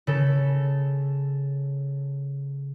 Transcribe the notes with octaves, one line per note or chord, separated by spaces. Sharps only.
C#3 A4